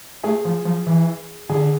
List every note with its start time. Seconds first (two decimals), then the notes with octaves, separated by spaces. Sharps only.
0.23 A3 G#4
0.45 F3
0.65 F3
0.87 E3
1.49 D3 G#4